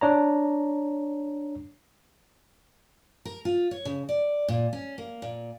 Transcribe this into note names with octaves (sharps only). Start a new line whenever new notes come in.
D4 C#5 A#5
A#4
F4
C#5
C#3
D5
A#2
C#4
A#3
A#2